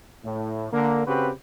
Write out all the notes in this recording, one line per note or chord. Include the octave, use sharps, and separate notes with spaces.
A2
D3 A#3
C#3 C4 F#4 G4 B4